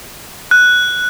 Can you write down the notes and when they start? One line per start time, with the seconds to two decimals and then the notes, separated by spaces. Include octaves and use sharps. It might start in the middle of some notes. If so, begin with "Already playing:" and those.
0.51 F#6